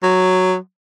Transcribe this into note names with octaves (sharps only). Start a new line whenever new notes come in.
F#3